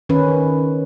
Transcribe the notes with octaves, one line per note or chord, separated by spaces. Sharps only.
D#3 C#4 B4